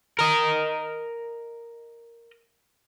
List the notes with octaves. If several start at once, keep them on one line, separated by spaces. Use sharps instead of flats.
A#4 D#5